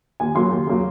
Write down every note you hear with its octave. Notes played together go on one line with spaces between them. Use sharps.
D#2 G#5
C#3 F#3 A#3 C6
D#2
C#3 F#3 A#3